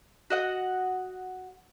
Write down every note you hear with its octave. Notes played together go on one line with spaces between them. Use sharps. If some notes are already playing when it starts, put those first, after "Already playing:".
F#4 D#5 F#5